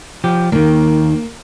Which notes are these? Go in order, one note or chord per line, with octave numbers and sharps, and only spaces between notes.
F3 G4
D#2 D#3 A#3